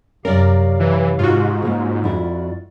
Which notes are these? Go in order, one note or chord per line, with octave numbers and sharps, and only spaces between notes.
F#2 C3 C#4 G4 A#4 D5 F5
E3
G#2 F4 F#4
C#3 A#3
F2 E4 D5